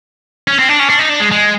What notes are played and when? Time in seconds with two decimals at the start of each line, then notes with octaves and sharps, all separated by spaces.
0.48 C#4
0.59 C4
0.69 D4
0.79 C#4
0.89 D4
0.99 D#4
1.09 D4
1.20 G#3
1.31 G#3